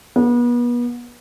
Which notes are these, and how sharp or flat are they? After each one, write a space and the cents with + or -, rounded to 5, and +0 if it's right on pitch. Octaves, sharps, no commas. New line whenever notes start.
B3 -35